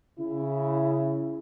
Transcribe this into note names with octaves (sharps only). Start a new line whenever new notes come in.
C#3 E4